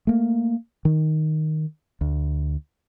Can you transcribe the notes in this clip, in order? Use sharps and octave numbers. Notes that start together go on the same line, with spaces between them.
A3 A#3
D#3
D2